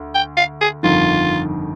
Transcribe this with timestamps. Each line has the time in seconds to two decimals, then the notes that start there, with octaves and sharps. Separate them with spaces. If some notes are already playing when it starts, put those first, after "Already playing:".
Already playing: D2
0.15 G5
0.37 F5
0.61 G#4
0.83 G1 F2 D#3 F4